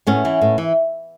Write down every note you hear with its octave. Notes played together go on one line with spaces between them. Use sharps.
A2 B3 C#4
E3
A2
E3